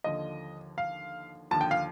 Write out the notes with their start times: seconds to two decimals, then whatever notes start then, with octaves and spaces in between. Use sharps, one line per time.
0.04 D#2 D3 F3 D#5
0.78 F5
1.51 D#2 D3 F3 A5
1.61 G5
1.71 F5